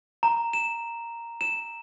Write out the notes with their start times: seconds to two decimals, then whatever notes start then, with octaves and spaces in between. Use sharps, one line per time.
0.23 A#5
0.53 E7
1.41 E7